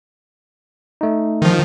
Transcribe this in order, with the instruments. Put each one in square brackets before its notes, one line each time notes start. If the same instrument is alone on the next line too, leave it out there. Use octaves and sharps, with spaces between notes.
[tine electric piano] A3 D#4
[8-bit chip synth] D#3 F3